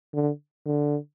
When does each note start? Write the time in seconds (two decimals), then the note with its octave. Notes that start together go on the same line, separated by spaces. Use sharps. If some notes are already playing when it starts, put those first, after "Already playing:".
0.14 D3
0.66 D3